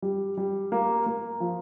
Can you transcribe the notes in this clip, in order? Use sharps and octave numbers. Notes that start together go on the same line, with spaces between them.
G3
G3
A#3
A#3
F3